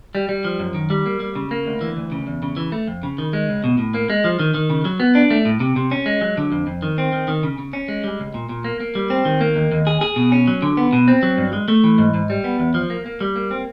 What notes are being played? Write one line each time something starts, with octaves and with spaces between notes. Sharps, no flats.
G3
G3
F3
F#2
D#3
G3
A#3
G3
C#3
A#3
D2
E3
D2
C#3
E2
C#3
E3
A3
F2
C#3
D#3
G#3
C#2
B2
A2
A#3
G#3
F3
D#3
D#3
C#3
F#3
B3
D4
A3
A2
C3
C3
C#4
G#3
F#3
D3
F2
F2
D#3
C4
D#3
D#3
C#3
C#3
C#4
G#3
G3
C#2
A#2
A#2
A#3
A#3
G3
C4
D#3
A#3
D#2
D#2
G#4
G#4
B2
C#4
F#3
D3
B3
B2
C4
F#3
G2
G#3
A3
E3
G#2
G#2
G3
B3
E2
F3
A#3
A#3
G3
A#3
C4